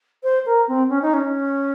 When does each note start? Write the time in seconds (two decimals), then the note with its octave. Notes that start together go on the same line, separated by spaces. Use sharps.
0.23 C5
0.46 A#4
0.68 C4
0.89 C#4
1.02 D#4
1.14 C#4